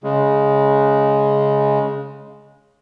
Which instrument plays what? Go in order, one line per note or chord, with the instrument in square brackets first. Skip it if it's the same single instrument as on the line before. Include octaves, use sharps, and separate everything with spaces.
[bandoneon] C#3 G#3